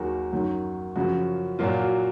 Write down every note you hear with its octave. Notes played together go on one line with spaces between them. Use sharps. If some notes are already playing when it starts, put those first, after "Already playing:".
Already playing: D#2 D#3 F#3 A#3 F#4 G#4
F#2 D#3 F#3
F#2 C#3 F3 F#4
A#2 F#3 A#3 F4
F#4